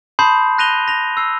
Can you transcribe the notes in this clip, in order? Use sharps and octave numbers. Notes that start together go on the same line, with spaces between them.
A5 B5 C6 D#6 G6 C7
F#6 A#6 D#7 F7 G7
A#6 F7
E6 C7